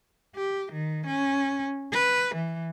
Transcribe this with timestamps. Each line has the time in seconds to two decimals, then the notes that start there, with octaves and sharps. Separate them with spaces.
0.35 G4
0.72 D#3
1.06 C#4
1.93 B4
2.35 E3